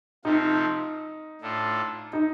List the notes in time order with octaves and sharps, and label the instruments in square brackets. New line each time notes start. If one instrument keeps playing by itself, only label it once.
[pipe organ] C3 F3 A3 C4 F4 [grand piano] D#4
[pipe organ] A2 A3 D4 F4
[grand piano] D#4